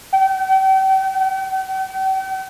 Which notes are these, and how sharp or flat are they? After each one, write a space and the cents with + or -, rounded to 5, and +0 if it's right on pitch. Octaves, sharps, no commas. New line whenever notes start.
G5 -40
G5 -45